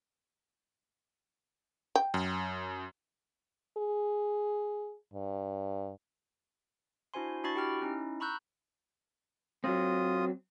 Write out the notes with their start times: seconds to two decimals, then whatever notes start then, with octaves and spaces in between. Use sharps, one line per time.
1.96 G5
2.14 F#2
3.77 G#4
5.14 G2
7.14 D4 E4 F#4 C5 G#5 C6
7.44 D4 E4 F#4 B5 C#6 A6
7.56 G4 G5 F6
7.82 C#4 D#4 E4
8.20 A#5 B5 C#6 E6 F#6 G6
9.64 F#3 C4 F4 D#6